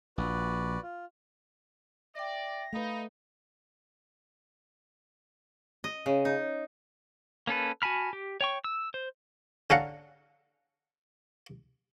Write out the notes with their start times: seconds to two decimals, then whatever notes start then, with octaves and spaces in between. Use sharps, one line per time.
0.18 A#1 F#4 B4 D5
0.83 F4
2.15 D5 E5 G5 A#6
2.73 A3 D#4 B4 F5 B5
5.84 D#5
6.06 C#3
6.25 D#4
7.47 A#3 C#4 A4 B4
7.82 F#4 G#5 A5 B5 F6
8.13 G4
8.41 C#5 G5 C#6
8.64 E6
8.94 C5
9.70 D3 C#4 A4 F5 F#5 A#5